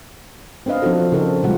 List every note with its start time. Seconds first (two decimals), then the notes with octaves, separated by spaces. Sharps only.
0.66 C4 D4 B4 D#5 F5
0.82 F3 C4 D4 D#4 F#4 A4
1.12 C#3 D4 D#4 A4 A#4 C5
1.43 A#2 C#3 G3 G#3 F4 F#5